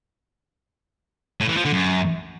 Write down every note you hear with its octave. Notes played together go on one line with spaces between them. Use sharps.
A2
E3
F3
D3
F#2